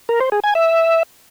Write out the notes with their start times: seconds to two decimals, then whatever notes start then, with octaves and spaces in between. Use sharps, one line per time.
0.09 A#4
0.20 C5
0.32 G#4
0.44 G#5
0.55 E5